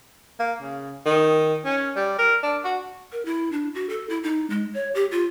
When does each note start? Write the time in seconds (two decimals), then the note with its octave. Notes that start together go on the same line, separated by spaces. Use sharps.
0.39 A#3
0.62 C#3
1.06 D#3
1.65 C#4
1.96 G3
2.18 A#4
2.43 D4
2.64 F#4
3.12 A#4
3.25 E4
3.52 D4
3.75 F#4
3.89 A4
4.10 E4
4.23 D#4
4.50 G#3
4.74 C#5
4.95 G4
5.12 F4